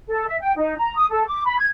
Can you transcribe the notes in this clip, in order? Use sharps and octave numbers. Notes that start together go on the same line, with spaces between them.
A4
E5
G5
D#4
A#5
D#6
A4
D6
B5
G#6